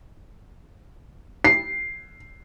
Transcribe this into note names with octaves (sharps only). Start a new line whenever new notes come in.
C7